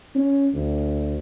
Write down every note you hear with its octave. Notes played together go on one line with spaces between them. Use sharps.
C#4
D2